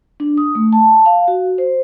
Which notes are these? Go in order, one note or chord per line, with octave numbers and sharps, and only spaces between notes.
D4
D#6
A3
A5
F5
F#4
C5